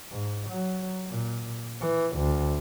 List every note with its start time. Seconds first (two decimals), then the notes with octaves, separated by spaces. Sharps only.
0.11 G#2
0.50 F#3
1.09 A#2
1.81 E3
2.17 D2